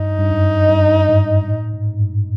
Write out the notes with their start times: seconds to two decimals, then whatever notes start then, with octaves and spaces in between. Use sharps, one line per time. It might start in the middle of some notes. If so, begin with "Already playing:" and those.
Already playing: G2 D#4
0.18 G2
0.31 F#2
0.69 G2
1.09 G#2
1.48 A2
1.73 G#2
1.94 G#2
2.00 G2